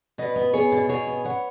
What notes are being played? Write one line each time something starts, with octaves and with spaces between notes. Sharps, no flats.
B2 B4 D#5
B3
B3 G#4 C#5
B2
B2 G#4 C#5
B3
B3 C#5 F#5